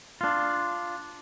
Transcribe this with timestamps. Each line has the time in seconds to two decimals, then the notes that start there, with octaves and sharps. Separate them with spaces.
0.21 D4 F4